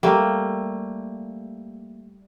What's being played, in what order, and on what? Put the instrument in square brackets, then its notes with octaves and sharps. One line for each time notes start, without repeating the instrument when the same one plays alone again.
[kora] G3 A3 A#3